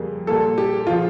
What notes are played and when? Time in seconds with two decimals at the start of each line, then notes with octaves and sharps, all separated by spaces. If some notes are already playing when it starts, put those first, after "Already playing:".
Already playing: F2 C#3 G3 A#3
0.27 A#2 G3 A#3 A4
0.58 G4
0.87 C#3 F3 F4